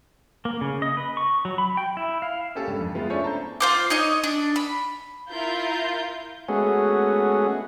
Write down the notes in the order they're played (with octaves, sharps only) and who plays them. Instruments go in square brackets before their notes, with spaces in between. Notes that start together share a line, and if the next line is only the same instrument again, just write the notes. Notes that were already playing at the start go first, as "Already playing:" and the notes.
[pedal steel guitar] A#3
C#3
D#5
B4
C#6
F#3
B5
G5
E4
F5
[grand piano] A#3 C#4 G4 A4
G2
F2
G#3 A3 B3 F4
C#4 D4 E4 A4 C5 C#5
A5 A#5 G6
[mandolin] F4 C5 D6
D#4 C#5 D#5
D4
B5
[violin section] E4 F4 A#4 G6
[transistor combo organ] G#3 A3 B3 C#4 F#4 G#4